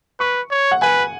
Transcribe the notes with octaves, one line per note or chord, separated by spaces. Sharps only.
B4 C#6
C#5
F#5
B4 G#5